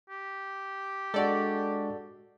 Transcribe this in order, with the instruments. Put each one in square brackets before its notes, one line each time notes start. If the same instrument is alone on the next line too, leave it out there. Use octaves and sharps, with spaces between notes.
[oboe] G4
[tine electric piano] G#3 D4 F#4 [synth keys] A4 D5